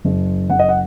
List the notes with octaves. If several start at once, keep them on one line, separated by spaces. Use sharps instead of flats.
F#1
F#1 F#5
D#5
F#5